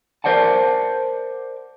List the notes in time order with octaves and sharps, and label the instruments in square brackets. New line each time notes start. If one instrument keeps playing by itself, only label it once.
[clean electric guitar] A#4 C5 D5 F#5 A5